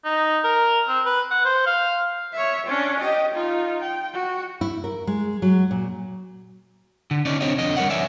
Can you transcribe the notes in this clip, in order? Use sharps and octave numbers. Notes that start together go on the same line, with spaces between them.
D#4
A#4
C4
B4
F#5
C5
F5
C#5 E5
C#4 D4
G4 D#5
D#4 F4
G5
F#4
E4
A#4
G#3
F#3
A#2
D3
C#4 D#4 D5
C3 C4 D4 F#4 C#5 D#5
F2 D3 D#5
G3 A#4 C5 C#5 F#5
C#5 D5 E5 G#5